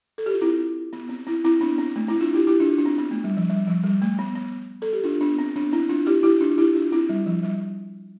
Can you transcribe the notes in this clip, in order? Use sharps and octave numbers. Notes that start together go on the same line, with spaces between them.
A4
G4
F4
C4 E4
B3
C4
C4 E4
C4 E4
B3 D4
C4
A3
C4 E4
D4 F4
E4 G4
E4 G4
D4 F4
D4
C4
B3
A3
G3
F3
G3
F3
G3
A3
B3
B3
A4
G4
D4 F4
B3 D4
C4
B3 D4
C4 E4
D4 F4
E4 G4
E4 G4
D4 F4
E4 G4
D4 F4
C4 E4
G3
F3
G3